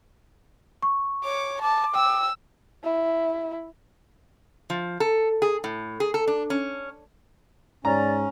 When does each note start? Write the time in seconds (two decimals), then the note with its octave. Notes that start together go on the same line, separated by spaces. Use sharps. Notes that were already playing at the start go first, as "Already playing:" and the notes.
0.82 C#6
1.24 C#5 D6
1.62 A5 D6
1.95 G5 E6
2.84 E4
4.70 F3
5.00 A4
5.42 G#4
5.64 A2
6.00 G#4
6.14 A4
6.28 D4
6.50 C#4
7.85 G#2 C#4 D5 A#5